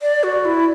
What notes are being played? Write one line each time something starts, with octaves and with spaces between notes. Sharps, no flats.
D5
F#4
E4